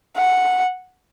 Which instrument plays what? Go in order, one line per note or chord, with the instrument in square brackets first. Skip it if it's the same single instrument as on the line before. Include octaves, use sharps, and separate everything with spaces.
[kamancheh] F#5